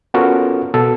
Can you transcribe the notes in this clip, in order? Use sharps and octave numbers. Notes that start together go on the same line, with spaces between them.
B3 C#4 F4 F#4 A4 A#4
B2 A4